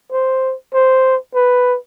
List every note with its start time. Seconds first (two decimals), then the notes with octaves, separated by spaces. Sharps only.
0.12 C5
0.74 C5
1.35 B4